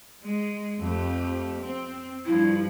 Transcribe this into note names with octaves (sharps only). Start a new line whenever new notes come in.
G#3
F2 A3 G4
C4
G2 F3 E4